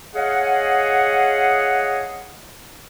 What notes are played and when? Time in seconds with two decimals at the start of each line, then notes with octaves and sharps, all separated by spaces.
0.15 G#4 C#5 D#5 F5 F#5